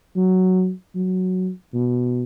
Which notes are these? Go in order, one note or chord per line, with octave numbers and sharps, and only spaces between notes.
F#3
F#3
B2